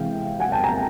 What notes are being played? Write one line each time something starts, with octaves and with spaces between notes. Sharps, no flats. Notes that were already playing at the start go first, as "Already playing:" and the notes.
Already playing: C3 E3 G#3 F5 G5
F#5 G#5
G5 A5
G#5 A#5